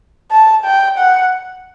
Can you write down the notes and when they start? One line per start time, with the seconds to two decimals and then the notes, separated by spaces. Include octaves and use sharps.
0.31 A5
0.65 G5
0.98 F#5